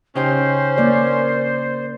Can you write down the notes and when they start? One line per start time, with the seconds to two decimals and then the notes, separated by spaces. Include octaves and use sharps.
0.15 C#3 C#4 D#4 G4 C5
0.78 A#3 D5